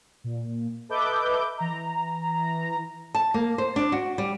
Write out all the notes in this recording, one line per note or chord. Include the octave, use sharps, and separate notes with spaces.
A#2
A4 B4 D#5 E5 D6 G6
E3 A#5
A5
A#3
C5
D4
F#4
G3